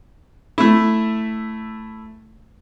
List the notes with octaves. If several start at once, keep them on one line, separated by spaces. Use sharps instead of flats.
A3 E4